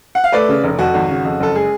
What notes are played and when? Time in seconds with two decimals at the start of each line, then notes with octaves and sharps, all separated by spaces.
0.15 F#5
0.24 F5
0.32 A3 B4 D5
0.49 C#3
0.63 F1
0.79 F2 F#4
0.94 G#1
1.09 C#3
1.25 F2
1.40 F#1 A4
1.55 G#3 G#4